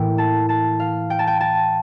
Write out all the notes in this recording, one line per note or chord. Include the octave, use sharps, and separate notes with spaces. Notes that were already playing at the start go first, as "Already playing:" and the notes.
Already playing: A2 E3 A#3 E4 G5
A5
A5
F5
G5
A5
G5
A5